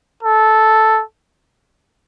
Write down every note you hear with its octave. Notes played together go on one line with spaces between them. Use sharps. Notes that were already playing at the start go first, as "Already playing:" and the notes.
A4